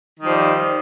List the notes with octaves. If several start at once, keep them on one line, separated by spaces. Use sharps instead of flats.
D#3 F3 G3